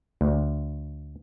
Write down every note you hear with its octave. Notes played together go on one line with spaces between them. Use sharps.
D2